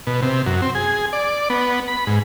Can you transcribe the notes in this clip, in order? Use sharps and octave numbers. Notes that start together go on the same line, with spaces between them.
B2
C3
F#2
C4
G#4
D5
B3
B5
G#2